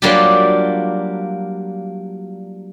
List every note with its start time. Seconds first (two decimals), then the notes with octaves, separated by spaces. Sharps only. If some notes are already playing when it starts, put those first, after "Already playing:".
0.02 F#3 G3 A#3 D4 F4 G4